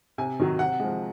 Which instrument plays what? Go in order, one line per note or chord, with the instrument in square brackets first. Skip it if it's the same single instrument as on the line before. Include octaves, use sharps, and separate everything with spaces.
[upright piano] C3 G#5
D#3 F#3
C3 F#5
F3 G#3